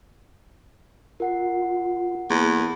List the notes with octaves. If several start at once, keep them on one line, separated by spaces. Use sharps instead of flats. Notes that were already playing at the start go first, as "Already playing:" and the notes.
F4 A#4 F#5 C7
E2 A#3 G#4 C6